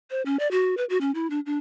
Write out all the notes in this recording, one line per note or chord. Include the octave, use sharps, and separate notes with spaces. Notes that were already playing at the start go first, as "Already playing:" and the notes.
C5
C#4
D5
F#4
B4
F#4
C#4
E4
D4
D4